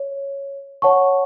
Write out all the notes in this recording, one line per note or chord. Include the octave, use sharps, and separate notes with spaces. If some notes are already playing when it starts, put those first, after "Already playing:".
Already playing: C#5
C#5 F#5 A5 C#6